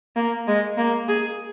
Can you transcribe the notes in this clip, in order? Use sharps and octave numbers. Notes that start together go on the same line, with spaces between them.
A#3
G#3
A#3
G#4